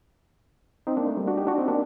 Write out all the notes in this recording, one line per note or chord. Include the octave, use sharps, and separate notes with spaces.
C4 D#4
A#3 D4
A3
G3 A#3
D4 F#4
D#4 G4
D4 F#4
C4 D#4
A#3 D4